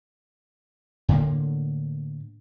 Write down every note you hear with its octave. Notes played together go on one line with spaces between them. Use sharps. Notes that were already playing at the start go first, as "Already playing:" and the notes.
A2 D3 A#3